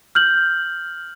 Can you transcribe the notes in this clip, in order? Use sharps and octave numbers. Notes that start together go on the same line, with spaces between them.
F6 G6 F#7